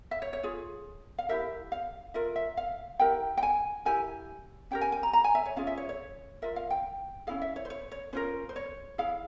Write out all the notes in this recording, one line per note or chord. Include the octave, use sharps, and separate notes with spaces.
E5
C#5
C#5
F4 G#4
F5
E4 G4 A#4 E5
F5
F4 A#4 E5
E5
F5
E4 G4 A#4 G5
G5
G#5
E4 G4 A#4 G#5
C#4 G4 A#4 G5
G#5
G#5
A#5
A#5
G#5
E5
C#5
C#4 F4 G#4 F5
E5
C#5
C#5
F4 A#4 E5
F5
G5
C#4 E4 G#4 F5
E5
C#5
C5
C#5
C#5
C#4 F4 A#4 C5
C5
C#5
E4 G#4 F5